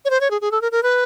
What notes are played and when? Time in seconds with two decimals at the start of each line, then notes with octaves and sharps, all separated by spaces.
0.05 C#5
0.10 C5
0.21 C#5
0.31 G#4
0.41 G#4
0.51 A4
0.61 A#4
0.72 A#4
0.83 B4